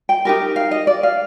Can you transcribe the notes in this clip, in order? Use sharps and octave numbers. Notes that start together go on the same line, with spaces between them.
G5
D#4 G4 A#4
F5
D#5
D5
F5